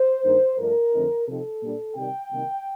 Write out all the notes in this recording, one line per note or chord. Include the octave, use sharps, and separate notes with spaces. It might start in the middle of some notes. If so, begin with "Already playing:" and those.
Already playing: C5
G2 D#3 A#3 D#4
G2 F3 A3 D4 A#4
F2 D3 A3 C4 D#4
C3 F3 C4 D#4 A4
A#2 G3 D4
C3 D#3 G3 G5
C3 D#3 G3 A#3 D#4